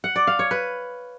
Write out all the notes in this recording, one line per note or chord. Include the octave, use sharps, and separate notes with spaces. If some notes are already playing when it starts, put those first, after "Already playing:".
F#5
D5
F5
C#5
B4